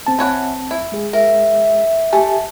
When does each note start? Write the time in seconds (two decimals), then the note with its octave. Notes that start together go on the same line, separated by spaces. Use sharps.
0.07 C2 C4 A5
0.19 E3 C#5 F#5
0.71 E4
0.92 G#3 G#4
1.13 A#4 E5
2.13 A3 G4 G#5